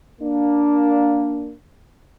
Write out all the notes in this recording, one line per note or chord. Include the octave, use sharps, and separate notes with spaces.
A#3 D4